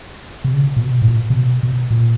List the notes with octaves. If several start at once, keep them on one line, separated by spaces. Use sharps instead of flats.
C3
C#3
A#2
B2
A2
A#2
C3
B2
B2
A#2